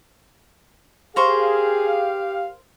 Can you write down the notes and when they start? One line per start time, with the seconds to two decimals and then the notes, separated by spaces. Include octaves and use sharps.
1.16 G4 G#4 A#4 C5 F5 C#6